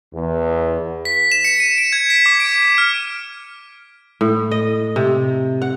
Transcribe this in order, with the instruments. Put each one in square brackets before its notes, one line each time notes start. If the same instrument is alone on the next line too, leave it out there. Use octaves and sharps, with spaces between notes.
[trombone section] E2
[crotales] B6
E7
C#7
D#7
D7
G#6
B6
D6
D7
F6
[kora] A2
D#5
C3
F#5